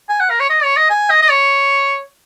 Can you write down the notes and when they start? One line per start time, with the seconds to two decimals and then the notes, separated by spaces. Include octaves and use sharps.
0.09 G#5
0.20 F#5
0.30 A#4
0.40 C#5
0.50 D#5
0.64 C#5
0.77 D#5
0.90 G#5
1.10 D#5
1.22 D#5
1.30 C#5